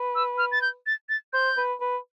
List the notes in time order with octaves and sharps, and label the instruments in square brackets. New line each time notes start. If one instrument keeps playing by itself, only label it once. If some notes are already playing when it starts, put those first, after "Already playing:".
Already playing: [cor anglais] B4
[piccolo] E6
F6
A6
G6
A6
A6
[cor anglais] C5 [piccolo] G6
[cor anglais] B4
B4